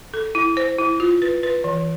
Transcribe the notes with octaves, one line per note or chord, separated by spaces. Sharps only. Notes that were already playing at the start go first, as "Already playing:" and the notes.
A4
E4
C5
E4
F4
B4
B4
E3